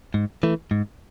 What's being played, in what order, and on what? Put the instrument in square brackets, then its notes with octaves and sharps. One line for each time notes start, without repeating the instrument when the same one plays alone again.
[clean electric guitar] G#2
E3 A3
G#2